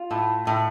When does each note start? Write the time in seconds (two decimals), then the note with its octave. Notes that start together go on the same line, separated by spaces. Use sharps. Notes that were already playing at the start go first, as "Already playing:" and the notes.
Already playing: F4
0.11 A2
0.47 A2